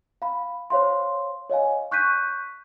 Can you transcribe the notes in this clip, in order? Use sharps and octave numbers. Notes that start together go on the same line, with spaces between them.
F5 B5
C5 C#5 F5 C6
C#5 D#5 F5 G#5
C#6 F#6 G6 B6 D#7